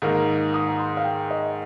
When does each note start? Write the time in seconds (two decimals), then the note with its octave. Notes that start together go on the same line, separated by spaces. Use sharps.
0.02 G#2 D#3 A#3 D#4 A#5
0.54 D#6
0.69 A#5
0.79 C6
0.97 F5
1.04 G5
1.31 D#5